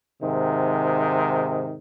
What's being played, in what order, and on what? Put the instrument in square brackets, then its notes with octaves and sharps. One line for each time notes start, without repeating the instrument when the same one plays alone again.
[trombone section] G#2 C3 D#3